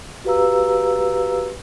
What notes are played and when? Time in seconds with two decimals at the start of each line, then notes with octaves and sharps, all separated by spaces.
0.24 F#4 G4 B4 F5 A#5 E6